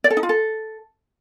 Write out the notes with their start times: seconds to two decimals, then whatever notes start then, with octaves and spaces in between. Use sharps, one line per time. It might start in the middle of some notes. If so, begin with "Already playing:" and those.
0.04 D5
0.10 A4
0.17 D#4
0.23 F4
0.29 A4